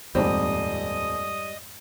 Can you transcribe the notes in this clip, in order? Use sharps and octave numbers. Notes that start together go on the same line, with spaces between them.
D#1 F2 G#2 G3 C4 D#5 D#6